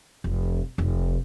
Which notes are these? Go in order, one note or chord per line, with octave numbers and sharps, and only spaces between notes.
F1
F1